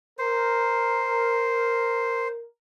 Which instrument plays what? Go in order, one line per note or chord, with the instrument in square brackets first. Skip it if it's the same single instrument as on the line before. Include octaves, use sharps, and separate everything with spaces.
[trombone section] A#4 [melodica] C5